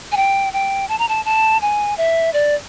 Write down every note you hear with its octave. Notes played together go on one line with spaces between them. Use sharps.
G#5
G5
G5
A5
A#5
A5
A5
G#5
E5
D5